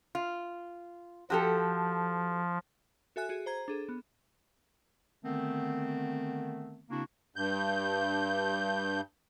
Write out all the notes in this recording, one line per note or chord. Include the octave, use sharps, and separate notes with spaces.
F4
F3 F#4 G4 A4
F#4 A4 E5 G#5 F#6
F#4 G#4
C5 A#5 G#6
D4 G#4 A4
B3
D3 D#3 A3 B3 C4
C#3 A#3 C4 D4 E4 F#4
G2 G6